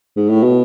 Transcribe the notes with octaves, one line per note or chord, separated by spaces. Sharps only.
G#2
A2
B2